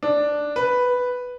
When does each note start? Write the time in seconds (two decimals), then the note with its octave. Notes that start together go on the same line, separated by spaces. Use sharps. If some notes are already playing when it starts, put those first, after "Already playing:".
0.03 D4
0.56 B4